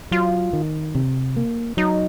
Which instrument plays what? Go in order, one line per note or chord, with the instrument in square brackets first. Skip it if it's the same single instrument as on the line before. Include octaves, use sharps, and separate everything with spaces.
[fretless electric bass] F#3 [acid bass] F4
[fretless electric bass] D#3
C3
A#3
[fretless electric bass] F#3 [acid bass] D#4